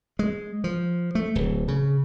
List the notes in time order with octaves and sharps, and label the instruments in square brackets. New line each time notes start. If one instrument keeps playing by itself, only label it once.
[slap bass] G#3
F3
A3
D1
C#3